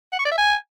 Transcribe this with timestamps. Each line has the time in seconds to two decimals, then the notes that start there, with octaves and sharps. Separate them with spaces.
0.12 F#5
0.19 C#6
0.25 D5
0.31 E5
0.38 G#5